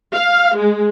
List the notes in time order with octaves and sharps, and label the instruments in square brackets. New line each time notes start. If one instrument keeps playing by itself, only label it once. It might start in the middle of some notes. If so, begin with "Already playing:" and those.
[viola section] F5
G#3